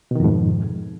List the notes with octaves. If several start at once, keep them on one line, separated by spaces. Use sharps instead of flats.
F2 G#2 B2 D#3